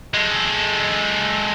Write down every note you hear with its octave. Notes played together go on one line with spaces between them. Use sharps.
G#3 A4